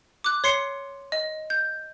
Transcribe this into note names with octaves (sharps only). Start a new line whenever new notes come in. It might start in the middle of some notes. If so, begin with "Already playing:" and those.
D6 F#6
C#5 C6 C7 C#7
D#5
G6